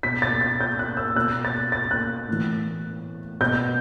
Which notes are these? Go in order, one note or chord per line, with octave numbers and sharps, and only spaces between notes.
B2 B6
A6
A6
G6
F#6
E6
B2 F#6
A6
A6
F#6
A2 E3
B2 G6